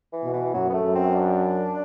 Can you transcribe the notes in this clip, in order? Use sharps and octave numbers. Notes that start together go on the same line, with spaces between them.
E3
B2
E3
F#2 F#3
B3
A3
F#2
C4
D4